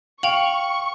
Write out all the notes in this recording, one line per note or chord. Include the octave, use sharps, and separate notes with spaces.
F5 G5 C#6 F7 F#7